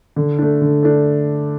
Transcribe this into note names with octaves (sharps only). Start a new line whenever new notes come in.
D3
A3 D4
D3
A3 D4